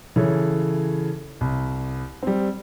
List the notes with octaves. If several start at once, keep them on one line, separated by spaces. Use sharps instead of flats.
C#3 E3 A4 C#5
C2
G3 C4